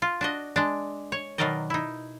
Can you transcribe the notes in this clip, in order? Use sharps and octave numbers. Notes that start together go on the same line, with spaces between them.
F4
D4 F#4 D#5
G#3 D4
C#5
B2 D#3 F#3 A#4 D5 D#5
D#4 E4